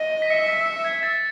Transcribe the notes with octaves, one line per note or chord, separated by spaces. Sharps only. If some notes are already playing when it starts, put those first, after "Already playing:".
Already playing: D#5
B6
E5 C#7
B6
C#7
G#6
A6